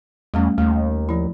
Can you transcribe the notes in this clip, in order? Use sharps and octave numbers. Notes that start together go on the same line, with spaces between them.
E2 G3 A3 C#4
D#2 A3
F3 E4